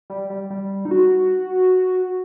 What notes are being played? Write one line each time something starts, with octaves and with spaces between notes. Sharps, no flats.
G3
G3
G3
D#4
F#4